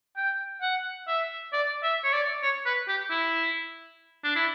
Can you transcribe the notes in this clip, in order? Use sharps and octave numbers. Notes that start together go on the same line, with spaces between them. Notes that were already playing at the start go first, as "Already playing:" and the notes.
G5
F#5
E5
D5
E5
C#5
D5
C#5
B4
G4
E4
D4
E4